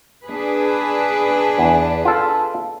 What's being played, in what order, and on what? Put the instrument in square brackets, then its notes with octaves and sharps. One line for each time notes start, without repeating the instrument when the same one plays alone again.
[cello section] D4 G#4 B4
[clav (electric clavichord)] E2
F4 A4